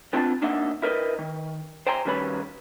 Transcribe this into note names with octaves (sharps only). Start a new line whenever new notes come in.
B3 C4 D4 F4 F#5 A5
A#3 D4 D#4 D#5 E5 F#5
E4 A#4 B4 D5 D#5
D#3
C5 G5 G#5 A#5 C6
B1 D#3 G3 C#4 B4 B5